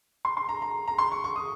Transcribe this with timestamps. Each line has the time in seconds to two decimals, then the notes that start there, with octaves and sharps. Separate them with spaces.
0.25 C6
0.37 C6
0.49 A#5
0.62 A#5
0.88 A#5
0.98 C6
1.12 C#6
1.24 C#6
1.36 D#6